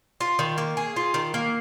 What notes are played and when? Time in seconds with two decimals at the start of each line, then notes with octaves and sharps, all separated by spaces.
0.20 F4
0.39 D#3
0.58 A#3
0.77 G#4
0.96 F4
1.14 D#3
1.34 A#3